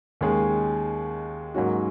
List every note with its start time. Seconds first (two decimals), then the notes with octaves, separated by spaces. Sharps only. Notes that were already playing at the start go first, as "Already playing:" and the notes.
0.21 D#2 D#3 G#3 C#4 G#4
1.54 G#2 F#3 A#3 C#4 F#4